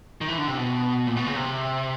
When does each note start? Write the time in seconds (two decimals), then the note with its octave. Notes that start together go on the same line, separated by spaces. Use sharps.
0.21 D#3
0.28 E3
0.38 D3
0.48 C3
0.58 B2
1.07 A#2
1.16 B2
1.26 C#3
1.36 C3